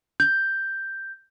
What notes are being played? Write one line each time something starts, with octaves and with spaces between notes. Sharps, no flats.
G6